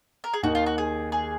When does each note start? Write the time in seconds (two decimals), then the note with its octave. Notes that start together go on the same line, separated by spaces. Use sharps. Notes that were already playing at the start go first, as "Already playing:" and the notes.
0.24 A#4
0.34 G#4
0.43 D#2 D#3 A#3 D#4 F#4
0.55 F4
0.66 F#4
0.78 G#4
1.12 G#4